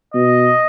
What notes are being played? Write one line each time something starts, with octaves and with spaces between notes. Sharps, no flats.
B2 D#5